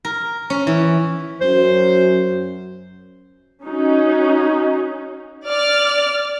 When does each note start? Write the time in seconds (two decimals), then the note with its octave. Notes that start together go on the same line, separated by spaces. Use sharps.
0.05 A#4
0.50 C#4
0.67 E3
1.41 F#2 C5
3.65 C#4 D#4 F#4
5.48 D5 F6